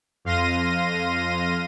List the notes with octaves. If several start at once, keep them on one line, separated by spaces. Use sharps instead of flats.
F2 F5 C6 A#6 D#7